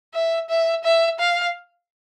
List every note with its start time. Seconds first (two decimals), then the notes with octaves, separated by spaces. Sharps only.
0.14 E5
0.49 E5
0.84 E5
1.19 F5